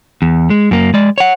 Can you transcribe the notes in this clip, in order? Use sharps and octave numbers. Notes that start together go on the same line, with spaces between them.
E2
G#3
F#2 A#3
G#3 D5
C#5 F#5